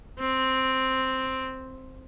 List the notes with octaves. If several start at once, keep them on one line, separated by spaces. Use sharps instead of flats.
C4